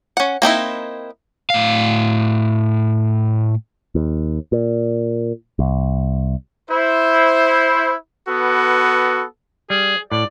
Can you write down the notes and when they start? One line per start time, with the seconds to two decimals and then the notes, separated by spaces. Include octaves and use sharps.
0.17 C#4 F#5
0.42 A#3 C4 D#4 E4
1.50 A2 F5
3.95 D#2
4.52 A#2
5.59 C2
6.71 E4 C5
8.29 B3 F#4 A4 B4
9.70 G3 G#4
10.12 A2 D5